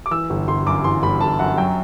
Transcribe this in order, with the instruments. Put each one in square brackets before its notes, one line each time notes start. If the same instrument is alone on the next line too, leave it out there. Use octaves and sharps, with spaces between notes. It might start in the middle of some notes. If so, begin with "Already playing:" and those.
[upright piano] D6
E3 E6
G1
G1 C6
F#2 D6
E3 C6
G1 B5
G1 A5
F#2 F#5
F#3 G5